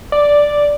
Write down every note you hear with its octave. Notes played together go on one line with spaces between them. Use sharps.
D5